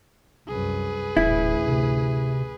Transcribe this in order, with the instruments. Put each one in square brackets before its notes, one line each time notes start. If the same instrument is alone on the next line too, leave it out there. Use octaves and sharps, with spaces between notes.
[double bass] C2 F#2 [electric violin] G#4 B4
[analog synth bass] D#1 [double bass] A1 D2 [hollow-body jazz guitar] E4
[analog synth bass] C3